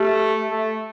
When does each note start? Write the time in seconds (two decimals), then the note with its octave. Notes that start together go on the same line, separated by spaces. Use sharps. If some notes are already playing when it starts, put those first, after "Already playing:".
Already playing: A3 G4
0.51 A3